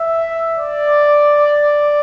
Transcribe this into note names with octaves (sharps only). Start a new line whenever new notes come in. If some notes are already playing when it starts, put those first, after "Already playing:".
Already playing: E5
D5